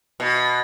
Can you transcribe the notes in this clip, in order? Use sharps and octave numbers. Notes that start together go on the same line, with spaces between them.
B2